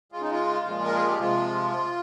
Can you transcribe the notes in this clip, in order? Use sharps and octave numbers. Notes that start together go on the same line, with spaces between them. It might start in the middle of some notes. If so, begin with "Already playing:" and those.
C#3 G#3 F4
D#4
F4
A#2 F3 G#3
A#4
G#4
G4
C3 F3 G#3 F4